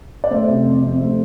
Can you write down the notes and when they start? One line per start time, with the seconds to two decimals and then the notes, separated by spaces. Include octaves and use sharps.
0.24 D5
0.31 A3 C5 E5
0.49 C3
0.66 F2
0.84 F2
1.01 A3